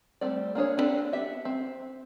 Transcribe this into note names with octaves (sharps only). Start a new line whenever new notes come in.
G3 A3 C4 D5
A#3 D4 G#4 C#5
B3 C4 D4 A4 B4
B3 G4 E5
C4